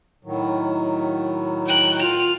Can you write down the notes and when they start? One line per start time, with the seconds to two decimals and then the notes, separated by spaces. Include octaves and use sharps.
0.25 A2 D#3 F#3
1.67 G5 F#6
2.01 F4 F7